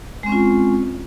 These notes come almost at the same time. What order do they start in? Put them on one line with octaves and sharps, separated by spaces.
G#3 C4 C#4 F4